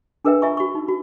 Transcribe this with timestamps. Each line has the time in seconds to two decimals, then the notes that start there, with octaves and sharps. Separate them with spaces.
0.25 D4 G#4 A#4 B4 E5 G5
0.42 F4 E5 G#5 A#5 C#6
0.57 F#4 C#6
0.75 D#4
0.88 F#4